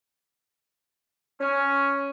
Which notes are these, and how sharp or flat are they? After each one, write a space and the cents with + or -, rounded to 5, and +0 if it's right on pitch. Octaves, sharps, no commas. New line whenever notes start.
C#4 +5